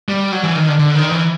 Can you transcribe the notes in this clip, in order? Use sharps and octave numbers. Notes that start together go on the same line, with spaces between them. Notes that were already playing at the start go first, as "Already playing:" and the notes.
G3
F#3
E3
D#3
D3
D3
D#3
E3